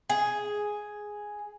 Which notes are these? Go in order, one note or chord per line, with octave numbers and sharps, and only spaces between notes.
G#4